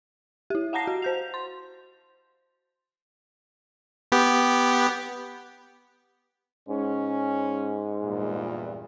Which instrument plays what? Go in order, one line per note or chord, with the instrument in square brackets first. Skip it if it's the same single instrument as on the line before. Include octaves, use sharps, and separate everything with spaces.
[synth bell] E4 G4
F5 F#5 A5 A#5 A#6 C7
F#4
C5 G6 F7
C6
[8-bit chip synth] B3 G4
[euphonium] G#2 [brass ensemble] C#4
[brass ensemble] E2 G2 A#2